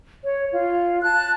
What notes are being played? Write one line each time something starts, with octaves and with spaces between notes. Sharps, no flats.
C#5
F4
A5 F#6